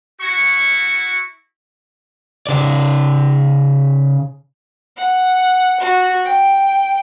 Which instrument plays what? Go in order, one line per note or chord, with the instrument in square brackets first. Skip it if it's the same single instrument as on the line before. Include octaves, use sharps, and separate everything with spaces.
[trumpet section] E4 F#4 C#6
[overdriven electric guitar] C#3 D5
[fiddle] F#5
F#4
G5